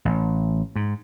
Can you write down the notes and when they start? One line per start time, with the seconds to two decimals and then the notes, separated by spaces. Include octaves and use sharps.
0.05 A1
0.76 G#2